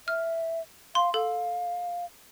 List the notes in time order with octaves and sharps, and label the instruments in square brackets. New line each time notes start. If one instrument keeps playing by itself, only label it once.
[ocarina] E5 [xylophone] F6
[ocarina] F5 [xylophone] C6
[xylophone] A4 [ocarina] F5